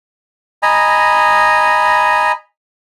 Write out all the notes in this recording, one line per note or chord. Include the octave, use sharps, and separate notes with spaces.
D#5 G#5 A#5 B5